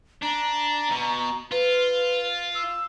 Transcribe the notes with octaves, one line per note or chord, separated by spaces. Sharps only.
D4 A#5
B2
F4 B4
E6